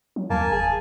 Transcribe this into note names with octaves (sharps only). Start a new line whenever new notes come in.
F#3
D#2 A#3 G#5 A5
F1 G#4